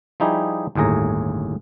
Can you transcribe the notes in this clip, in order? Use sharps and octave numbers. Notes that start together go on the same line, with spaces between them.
F3 G3 D#4 E4 G4 G#4
G1 D#2 A2 G#4 A#5